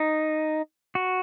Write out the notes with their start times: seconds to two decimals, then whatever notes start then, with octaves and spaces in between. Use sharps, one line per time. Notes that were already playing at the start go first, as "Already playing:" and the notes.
Already playing: D#4
0.95 F#4